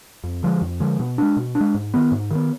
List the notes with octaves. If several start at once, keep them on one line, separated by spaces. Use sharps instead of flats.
F2
D3 F3 G#3
F2
D3 F3 G#3
B2
G#3 D4
B2
D4
G#3
G#2
D#3 B3
G#2
D#3 B3